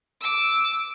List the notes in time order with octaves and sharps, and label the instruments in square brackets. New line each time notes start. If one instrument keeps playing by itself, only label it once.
[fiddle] D6 E6